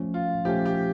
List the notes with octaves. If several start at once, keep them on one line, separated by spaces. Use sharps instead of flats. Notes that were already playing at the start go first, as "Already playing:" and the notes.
Already playing: F3 A3 C#4
F4
F3 A3 C#4 G4
G4